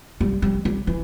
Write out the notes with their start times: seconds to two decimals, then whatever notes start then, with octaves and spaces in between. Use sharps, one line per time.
0.21 G3
0.42 G3
0.65 G3
0.87 E3